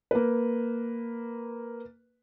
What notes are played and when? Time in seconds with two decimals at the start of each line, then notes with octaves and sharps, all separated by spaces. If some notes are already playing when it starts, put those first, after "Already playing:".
0.11 A#3 B4